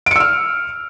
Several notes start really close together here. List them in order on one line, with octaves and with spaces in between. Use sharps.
D7 C#7 E6 F6